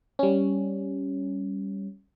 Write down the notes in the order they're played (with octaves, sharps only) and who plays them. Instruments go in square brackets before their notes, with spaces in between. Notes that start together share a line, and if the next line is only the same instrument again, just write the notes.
[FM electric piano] G3 C#4